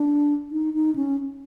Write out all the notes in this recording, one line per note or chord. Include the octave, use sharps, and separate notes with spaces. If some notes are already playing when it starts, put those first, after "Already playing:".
Already playing: D4
D#4
D#4
C#4